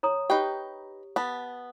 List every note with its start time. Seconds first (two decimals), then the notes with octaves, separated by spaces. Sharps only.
0.03 C#5 A#5 D#6
0.30 D#4 G4 B4 G5
1.16 B3 F5 A5